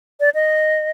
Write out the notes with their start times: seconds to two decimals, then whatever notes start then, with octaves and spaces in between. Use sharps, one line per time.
0.20 D5
0.35 D#5